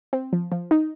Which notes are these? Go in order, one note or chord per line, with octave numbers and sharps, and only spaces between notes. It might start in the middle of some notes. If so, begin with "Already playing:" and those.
C4
F3
F3
D#4